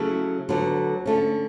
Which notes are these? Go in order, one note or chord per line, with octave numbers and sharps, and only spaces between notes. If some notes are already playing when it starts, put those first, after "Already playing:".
Already playing: C#3 F#3 A3 E4
D2 D3 F#3 B3
D3 A3 C#4